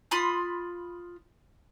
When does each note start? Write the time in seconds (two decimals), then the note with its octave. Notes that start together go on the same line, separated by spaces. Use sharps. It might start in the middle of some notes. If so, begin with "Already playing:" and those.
0.11 F4 B5 C6 D#6